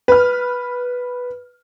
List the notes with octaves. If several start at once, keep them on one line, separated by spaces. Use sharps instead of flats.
B4 F6